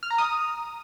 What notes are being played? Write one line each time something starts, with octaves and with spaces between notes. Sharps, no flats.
F6
A#5
D#6